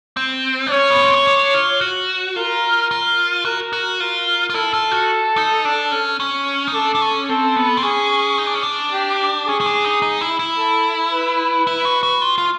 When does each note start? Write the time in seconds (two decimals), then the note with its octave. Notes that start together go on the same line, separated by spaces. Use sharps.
0.17 C4
0.67 D4
0.71 C#4 C#5
0.90 B3
1.02 C4
1.14 C#4
1.27 D4
1.54 F4
1.81 F#4
2.36 F4 A#4
2.91 F4
3.45 F#4 A#4
3.73 F#4
4.00 F4 A#4
4.50 F4
4.55 E4 A4
4.74 F4
4.91 F#4
5.37 D#4
5.65 D4
5.92 C#4
6.20 C#4
6.68 D#4
6.74 D4 A4
6.95 D4
7.02 C#4
7.29 C4 A4
7.56 B3
7.77 C4
7.83 C#4 G#4
8.38 D#4
8.47 D4
8.54 C#4
8.63 D4
8.93 G4
9.47 C#4 G#4
9.60 C#4
9.66 D4
9.85 D#4
10.02 D#4
10.21 E4
10.39 E4
10.57 A4
11.13 B4
11.67 E4
11.85 F#4
12.03 F#4
12.22 F4
12.38 F4